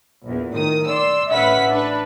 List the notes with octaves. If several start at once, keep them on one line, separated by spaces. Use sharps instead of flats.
A#1 E2
A2 D#3 D#6
D5 C6 E6
A1 C#4 B4 E5 F#5 B6
D4 B4